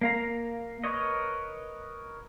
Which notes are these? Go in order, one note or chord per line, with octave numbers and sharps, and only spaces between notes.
A#3 F5 A#5
A#4 B4 C#5 D#5